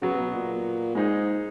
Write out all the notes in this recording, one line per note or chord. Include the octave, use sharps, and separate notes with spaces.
C#3 F#3 B3 F#4
B2
A#2
G#2 G#3 D#4 G#4